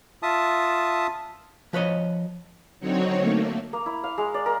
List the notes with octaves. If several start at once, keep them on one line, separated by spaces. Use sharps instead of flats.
F4 E5 A5 D#6
F3 B4 C#5 D#5
D3 F#3 C4 D#4 F#4 C#5
A3 A#3
A#3
E4
F5
G#3
D5
A#4